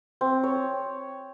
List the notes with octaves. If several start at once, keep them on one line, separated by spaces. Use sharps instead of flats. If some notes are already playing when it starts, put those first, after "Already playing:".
C4
C#5